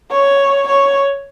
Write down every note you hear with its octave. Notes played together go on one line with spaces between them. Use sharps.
C#5
C#5